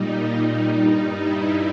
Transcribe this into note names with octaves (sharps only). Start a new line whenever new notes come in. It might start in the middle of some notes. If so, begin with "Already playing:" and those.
Already playing: A#2 G3 D#4
G2 G3 D#4
E4